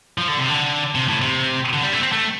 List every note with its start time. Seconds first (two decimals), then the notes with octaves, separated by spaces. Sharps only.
0.18 F3
0.28 D3
0.38 C3
0.49 D3
0.95 C3
1.08 A2
1.21 C3
1.73 D3
1.83 G3
1.93 A3
2.02 C4
2.12 A3